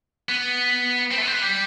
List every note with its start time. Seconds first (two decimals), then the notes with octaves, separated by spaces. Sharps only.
0.29 B3
1.11 C4
1.17 A3
1.22 B3
1.27 C4
1.32 B3
1.42 G3